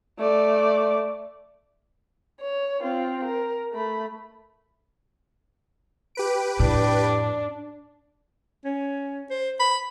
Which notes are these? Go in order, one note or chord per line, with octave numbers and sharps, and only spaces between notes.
A3 D5
C#5
C4 F4
A#4
A3 B5
G4 B4 D7
F2 A2 D4
C#4
C5
B5